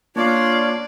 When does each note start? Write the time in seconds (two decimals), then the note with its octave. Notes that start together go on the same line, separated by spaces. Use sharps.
0.16 A#3 D4 F4 C#5 D5